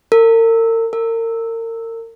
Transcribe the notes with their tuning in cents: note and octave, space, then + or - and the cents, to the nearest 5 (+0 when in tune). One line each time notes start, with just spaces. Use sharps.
A#4 -40
A#4 -35